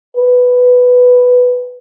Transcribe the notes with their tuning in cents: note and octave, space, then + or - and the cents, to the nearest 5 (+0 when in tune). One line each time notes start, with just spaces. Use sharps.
B4 +5